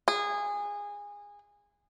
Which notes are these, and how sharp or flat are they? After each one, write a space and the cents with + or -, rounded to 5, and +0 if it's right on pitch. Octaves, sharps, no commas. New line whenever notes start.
G#4 -20